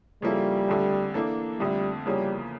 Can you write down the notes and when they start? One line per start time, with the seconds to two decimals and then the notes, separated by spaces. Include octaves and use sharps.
0.22 C#3 F3 G3 A#3 E4 A4
0.68 F2 D3 A3
1.14 E3 A#3 D4 A4
1.59 F2 D3 G3 A3
2.06 E2 C#3 F3 G3 A#3 C#4